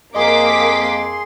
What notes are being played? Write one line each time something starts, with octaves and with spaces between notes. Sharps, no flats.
F2 A#3 G#4 D#5 C6 D6 B6